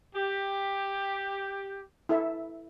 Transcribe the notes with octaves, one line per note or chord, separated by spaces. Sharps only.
G4
E4 A4 E5